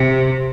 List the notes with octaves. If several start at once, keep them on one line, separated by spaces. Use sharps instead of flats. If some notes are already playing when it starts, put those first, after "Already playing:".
Already playing: C3